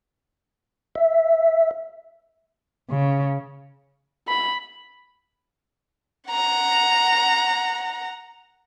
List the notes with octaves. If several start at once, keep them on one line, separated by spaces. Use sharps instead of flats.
E5
C#3
B5
F#5 A#5